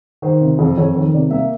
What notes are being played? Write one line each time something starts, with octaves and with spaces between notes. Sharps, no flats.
D#3 C5
C3
F2
F2 C#5
D#3 C#5
C3 D5
A#3 E5